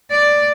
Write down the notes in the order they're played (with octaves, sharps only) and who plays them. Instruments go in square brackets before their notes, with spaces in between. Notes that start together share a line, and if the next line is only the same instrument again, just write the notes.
[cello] D5